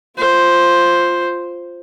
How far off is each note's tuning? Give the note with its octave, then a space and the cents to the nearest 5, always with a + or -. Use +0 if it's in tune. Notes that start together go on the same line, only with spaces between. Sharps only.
F4 +0 C5 +0